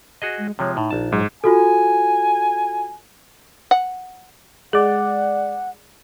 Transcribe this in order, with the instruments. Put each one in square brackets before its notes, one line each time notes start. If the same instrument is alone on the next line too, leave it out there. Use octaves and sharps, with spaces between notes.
[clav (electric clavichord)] F#4 G#4 D#5
[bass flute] G#3
[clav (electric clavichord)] C3 F3 G#3 [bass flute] C#5
[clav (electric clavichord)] A2 [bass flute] D#4
[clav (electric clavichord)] A#1 A5
[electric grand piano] G#2 [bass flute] F#3
[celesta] F4 F#4 A4 [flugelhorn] G#5
[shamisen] F#5
[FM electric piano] G#3 D5 [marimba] G#4 [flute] F#5